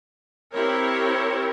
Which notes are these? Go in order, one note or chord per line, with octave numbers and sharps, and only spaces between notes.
C4 E4 G4 A#4 C#5